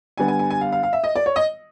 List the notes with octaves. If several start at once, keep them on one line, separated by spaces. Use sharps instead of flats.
D3 G3 B3 G#5
G#5
G#5
G#5
F5
F5
F5
E5
D#5
D5
C#5
D#5